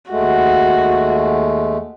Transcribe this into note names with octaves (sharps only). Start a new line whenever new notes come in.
D#2 G#3 A3 F#4